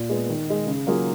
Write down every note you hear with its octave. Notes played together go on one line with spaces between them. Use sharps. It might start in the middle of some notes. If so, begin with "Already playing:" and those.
Already playing: A#2
G#3 B3
D#3
G#3 D#4
C#3
F#3 A#3 F4 G#4